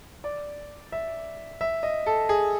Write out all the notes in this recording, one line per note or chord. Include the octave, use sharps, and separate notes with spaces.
D5
E5
E5
D#5
A4
G#4